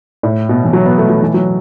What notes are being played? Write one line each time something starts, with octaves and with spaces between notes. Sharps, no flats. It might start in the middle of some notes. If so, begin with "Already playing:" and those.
A2
B2
E3
F#3
B3
A3
F#3
E3
F#3